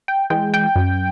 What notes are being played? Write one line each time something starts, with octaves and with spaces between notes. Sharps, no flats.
G5
E3 G#3 G5
G5
F#2